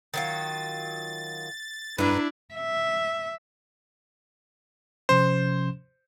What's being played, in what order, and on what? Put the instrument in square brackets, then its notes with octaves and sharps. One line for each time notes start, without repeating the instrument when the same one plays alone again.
[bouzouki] D#3 F#3 F4 [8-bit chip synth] A6
[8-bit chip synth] G2 [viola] D4 E4 [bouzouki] B4 A#5
[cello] E5
[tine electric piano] C3 F3 C#4 [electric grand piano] C5